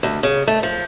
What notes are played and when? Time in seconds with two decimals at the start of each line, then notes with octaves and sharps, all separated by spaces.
0.03 D2
0.23 C#3
0.47 A3
0.63 F3